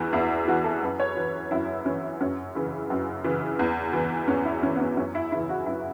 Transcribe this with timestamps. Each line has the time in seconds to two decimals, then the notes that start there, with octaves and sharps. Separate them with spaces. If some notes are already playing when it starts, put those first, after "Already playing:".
Already playing: E2 E3 F#4
0.13 E2 E4
0.48 E3 F#4
0.64 A4
0.82 F#2 B4
1.00 C#5
1.17 E3 B4
1.51 F#2 E4
1.85 E3 C#4
2.21 F#2 C#4
2.55 C#3 E3
2.90 F#2
3.24 C#3 E3
3.59 E2
3.93 E3
4.28 E2 C#4
4.45 E4
4.63 E3 C#4
4.76 B3
4.80 C#4
4.97 F#2 C#4
5.15 E4
5.31 C#3 E3 E4
5.49 F#4
5.66 F#2 E4